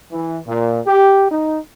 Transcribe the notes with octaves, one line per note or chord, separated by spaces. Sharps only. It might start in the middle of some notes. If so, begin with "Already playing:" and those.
E3
A#2
G4
D#4